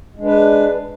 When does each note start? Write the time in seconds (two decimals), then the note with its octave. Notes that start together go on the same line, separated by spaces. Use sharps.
0.16 G#3
0.21 D4
0.25 B4